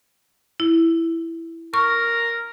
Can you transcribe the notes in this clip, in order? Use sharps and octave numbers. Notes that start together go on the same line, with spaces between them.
E4
A#4 C#6